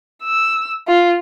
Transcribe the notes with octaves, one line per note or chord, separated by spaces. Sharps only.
E6
F4